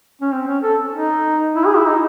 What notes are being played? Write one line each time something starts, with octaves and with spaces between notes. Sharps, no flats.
C#4
C4
C#4
A4
D#4
E4
G#4
E4
D#4